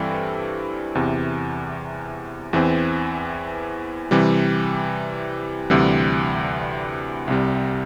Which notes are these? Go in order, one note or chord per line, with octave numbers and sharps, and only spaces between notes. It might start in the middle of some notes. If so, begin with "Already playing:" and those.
Already playing: G2 E3 G3 C4 A4
E2 C3 E3
E2 E3 C4
C3 E3 G3
D2 C3 E3 G3
C2 C3 G3